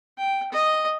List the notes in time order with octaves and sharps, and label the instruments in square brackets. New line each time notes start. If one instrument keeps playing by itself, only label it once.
[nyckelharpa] G5
D#5